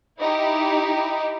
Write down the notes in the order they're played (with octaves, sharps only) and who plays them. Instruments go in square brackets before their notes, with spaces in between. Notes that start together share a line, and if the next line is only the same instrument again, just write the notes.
[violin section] D#4 E4 G4